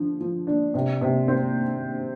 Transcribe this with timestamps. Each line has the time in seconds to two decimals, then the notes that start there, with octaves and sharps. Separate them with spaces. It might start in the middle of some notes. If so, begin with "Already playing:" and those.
Already playing: D3 F3
0.21 F3
0.47 D4
0.74 C3
1.01 C3
1.28 C4